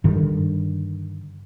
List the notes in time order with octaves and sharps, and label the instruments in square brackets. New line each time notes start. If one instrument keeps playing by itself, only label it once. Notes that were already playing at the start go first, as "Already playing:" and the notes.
[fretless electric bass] G2 D3 D#3 G3